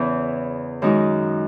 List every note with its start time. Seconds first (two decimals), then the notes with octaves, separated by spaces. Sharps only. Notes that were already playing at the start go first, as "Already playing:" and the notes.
Already playing: E2 C#3 E3
0.82 F#2 D#3 G#3 D#4 F#4